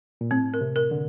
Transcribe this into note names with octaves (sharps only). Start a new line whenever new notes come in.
A#2
A2 C4
A#4
C3
A#4
D3